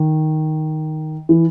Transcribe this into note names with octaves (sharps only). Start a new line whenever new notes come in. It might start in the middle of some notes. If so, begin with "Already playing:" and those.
Already playing: D#3
E3